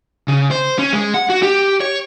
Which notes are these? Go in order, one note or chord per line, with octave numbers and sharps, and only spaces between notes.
C#3
C5
C#4
G#3
F#5
F#4
G4
C#5